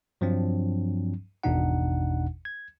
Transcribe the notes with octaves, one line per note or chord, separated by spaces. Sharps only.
G2 F3 F#3 C4 D4
G#1 E2 B2 D4 D#4 F#5
G#6